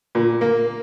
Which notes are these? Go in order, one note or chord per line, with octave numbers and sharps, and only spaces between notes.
A#2
A#3